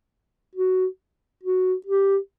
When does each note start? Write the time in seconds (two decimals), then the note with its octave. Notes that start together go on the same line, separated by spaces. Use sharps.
0.55 F#4
1.43 F#4
1.86 G4